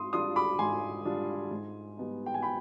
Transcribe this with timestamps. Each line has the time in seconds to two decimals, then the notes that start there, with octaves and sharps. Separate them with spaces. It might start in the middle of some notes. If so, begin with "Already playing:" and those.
Already playing: G#2 C6 D#6
0.13 G3 D4 F4 C6 D#6
0.36 B5 D6
0.59 G#2 G#5 C6
1.05 G3 D4 F4
1.51 G#2
1.97 G3 B3 D#4
2.26 G5
2.34 G#5
2.42 G5 B5